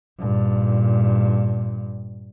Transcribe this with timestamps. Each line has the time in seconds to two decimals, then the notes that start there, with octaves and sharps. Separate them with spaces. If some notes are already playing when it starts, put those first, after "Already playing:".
0.20 G2 A#2